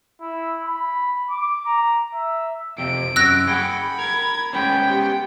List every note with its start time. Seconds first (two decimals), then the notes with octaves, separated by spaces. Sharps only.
0.21 E4
0.66 B5
1.30 D6
1.66 A#5
2.14 E5
2.78 F2 C3 D7
3.16 F#2 F#3 E6 F#6 A#6
3.47 G#4 F#5 G5 B5
3.99 A#4 G#6
4.53 G#3 B3 C#4 G5
4.89 G4